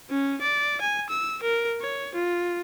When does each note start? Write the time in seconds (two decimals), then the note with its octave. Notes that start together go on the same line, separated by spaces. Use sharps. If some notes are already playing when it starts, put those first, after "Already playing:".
0.10 C#4
0.41 D5
0.81 G#5
1.10 E6
1.42 A#4
1.81 C#5
2.15 F4